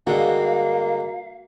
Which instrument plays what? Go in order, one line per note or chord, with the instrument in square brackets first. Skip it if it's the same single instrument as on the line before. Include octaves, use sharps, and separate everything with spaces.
[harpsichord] G2 D3 G#3 [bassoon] A#3 [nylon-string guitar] F#4 [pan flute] F5